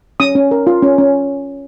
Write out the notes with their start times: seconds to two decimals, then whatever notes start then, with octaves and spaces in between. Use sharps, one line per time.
0.20 C#4 D#6
0.35 C#4
0.51 A#4
0.67 F4
0.83 C#4
0.98 C#4